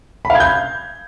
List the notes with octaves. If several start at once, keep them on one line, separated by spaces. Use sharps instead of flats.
B5
F5
G#6
G6